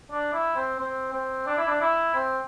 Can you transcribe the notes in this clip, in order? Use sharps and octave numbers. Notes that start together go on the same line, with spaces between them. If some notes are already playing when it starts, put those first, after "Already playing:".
D4
E4
C4
C4
C4
D4
E4
D4
E4
C4